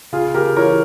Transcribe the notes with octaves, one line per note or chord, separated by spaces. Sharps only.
C#3 F4 G#4
C#3 G4 A#4
E3 A#4 C#5